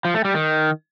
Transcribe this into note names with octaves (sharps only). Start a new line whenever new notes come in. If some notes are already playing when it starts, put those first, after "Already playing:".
F3
A3
G3
D#3